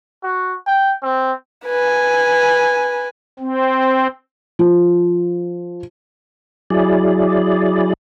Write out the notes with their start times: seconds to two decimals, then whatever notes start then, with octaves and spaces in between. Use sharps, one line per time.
0.23 F#4
0.67 G5
1.03 C4
1.66 B4 G#5
3.39 C4
4.59 F3
6.70 F#3 E4 G#4 D5